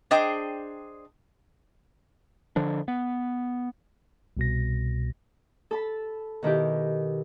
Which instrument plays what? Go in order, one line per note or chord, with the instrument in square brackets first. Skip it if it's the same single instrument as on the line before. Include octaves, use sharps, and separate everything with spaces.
[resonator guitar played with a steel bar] D4 G#4 C5 D#5 G5
[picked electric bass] D3 F3 D4
B3
[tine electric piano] C2 B2 A#6
[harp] A4 A5 B5
B2 D#3 E4 G4